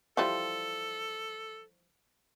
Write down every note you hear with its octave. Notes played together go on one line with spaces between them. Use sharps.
E3 F3 G3 A4